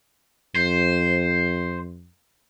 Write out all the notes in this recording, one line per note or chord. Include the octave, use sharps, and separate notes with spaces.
F2 C5